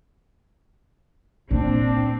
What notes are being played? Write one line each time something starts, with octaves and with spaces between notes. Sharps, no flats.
A#2 C4 D4